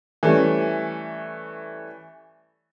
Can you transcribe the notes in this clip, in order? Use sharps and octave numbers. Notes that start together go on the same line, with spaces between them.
E3 G3 A3 C#4